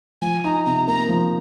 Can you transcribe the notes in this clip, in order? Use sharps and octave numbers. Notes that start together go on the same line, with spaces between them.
F3 G#5
D#4 A#5
C3 A#5
A#3 A#5
F3